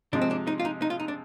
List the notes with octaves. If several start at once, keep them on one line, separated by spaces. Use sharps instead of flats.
C3 F3 G#3 D4
C4
D4
D#4
F4
D#4
D#4
F4
D#4
D4